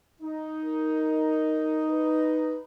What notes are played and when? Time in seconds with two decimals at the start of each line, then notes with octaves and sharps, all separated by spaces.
0.21 D#4
0.64 A#4
1.89 B4